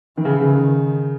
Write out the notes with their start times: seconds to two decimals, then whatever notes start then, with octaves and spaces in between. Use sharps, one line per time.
0.17 D#3 E3
0.25 C#3
0.41 C#3
0.53 D#3